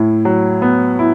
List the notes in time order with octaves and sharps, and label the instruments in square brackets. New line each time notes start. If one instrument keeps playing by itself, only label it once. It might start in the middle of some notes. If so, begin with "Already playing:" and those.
Already playing: [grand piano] A2 E4
F#3
B3
E4